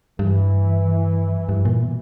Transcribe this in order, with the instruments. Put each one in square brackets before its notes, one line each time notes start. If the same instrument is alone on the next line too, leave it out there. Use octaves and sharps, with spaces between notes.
[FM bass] G2 [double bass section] E3
[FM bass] G2
A#2
B2